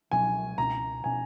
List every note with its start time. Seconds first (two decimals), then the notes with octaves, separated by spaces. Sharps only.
0.11 C#2 B2 F#3 C#4 G#5
0.58 C#2 B2 F#3 C#4 A#5
1.04 B2 F#3 C#4 G#5